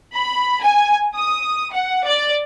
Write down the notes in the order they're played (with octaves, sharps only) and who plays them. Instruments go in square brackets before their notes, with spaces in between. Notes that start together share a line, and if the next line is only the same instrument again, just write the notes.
[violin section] B5
G#5
D#6
F#5
D5